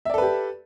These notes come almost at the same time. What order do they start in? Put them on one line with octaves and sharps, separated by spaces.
E5 D5 A4 B4 G4